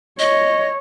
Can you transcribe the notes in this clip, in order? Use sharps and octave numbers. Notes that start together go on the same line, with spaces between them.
C#5 D#5